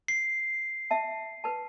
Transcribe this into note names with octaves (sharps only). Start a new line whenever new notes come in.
C7
E5 A5
B4 A5